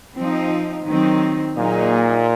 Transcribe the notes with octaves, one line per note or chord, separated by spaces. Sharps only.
F3 C4 D#4
D#3 F#3 C4 D#4
A#2 F#3 A#3 D#4 G#4